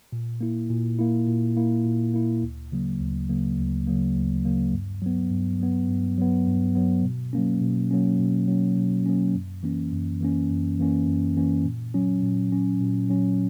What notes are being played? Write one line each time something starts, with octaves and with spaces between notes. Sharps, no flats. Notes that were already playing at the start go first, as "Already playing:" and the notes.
A#2
A#3 E4
A#2
A#3 E4
A#2
A#3 E4
A#2
A#3 E4
D2
C#3 F#3 A#3
D2
C#3 F#3 A#3
D2
C#3 F#3 A#3
D2
C#3 F#3 A#3
G2
F#3 B3
G2
F#3 B3
G2
F#3 B3
G2
F#3 B3
B2
F#3 A#3 C#4
B2
F#3 A#3 C#4
B2
F#3 A#3 C#4
B2
F#3 A#3 C#4
F#2
E3 A#3 C#4
F#2
E3 A#3 C#4
F#2
E3 A#3 C#4
F#2
E3 A#3 C#4
A#2
F#3 C#4
A#2
F#3 C#4
A#2
F#3 C#4